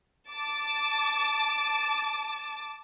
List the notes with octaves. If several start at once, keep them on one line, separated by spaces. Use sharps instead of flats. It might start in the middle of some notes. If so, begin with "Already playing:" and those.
A5 D6